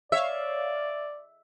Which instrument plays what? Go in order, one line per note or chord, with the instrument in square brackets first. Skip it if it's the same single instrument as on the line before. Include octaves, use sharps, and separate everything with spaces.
[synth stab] C#5 F5 [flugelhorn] D5 [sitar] E5